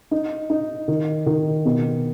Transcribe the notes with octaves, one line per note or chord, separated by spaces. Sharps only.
D#4
D#4
D#3
D#3
B2